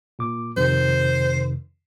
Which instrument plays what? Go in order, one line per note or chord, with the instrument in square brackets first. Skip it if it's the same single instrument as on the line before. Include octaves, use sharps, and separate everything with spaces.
[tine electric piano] A#2 D6
[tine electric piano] F2 C3 D#3 [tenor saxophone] C5